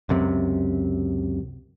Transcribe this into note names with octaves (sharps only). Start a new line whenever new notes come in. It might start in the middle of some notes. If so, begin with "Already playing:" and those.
C#2 F#2 C3